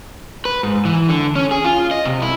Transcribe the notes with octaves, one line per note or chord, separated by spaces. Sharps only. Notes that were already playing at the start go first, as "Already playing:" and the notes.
B4
G#2
E3
D3
C#4
G#4
F4
D#5
C3
E4